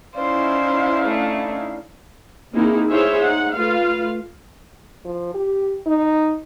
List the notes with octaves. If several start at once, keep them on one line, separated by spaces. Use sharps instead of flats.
C#4 D#4 E4 C5 D5 F5
A3 D4
A#3 C4 D#4 E4 G#4
E4 G#4 C5 C#5 E5 F5
D#4 F#5
A3 F4 B4 F5
F3
G4
D#4